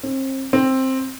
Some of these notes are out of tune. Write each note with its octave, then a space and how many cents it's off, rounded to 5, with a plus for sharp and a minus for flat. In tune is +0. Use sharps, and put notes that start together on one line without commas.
C4 +35
C4 +10